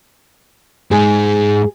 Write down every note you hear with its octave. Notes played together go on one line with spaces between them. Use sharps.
G#2 G#3 G#4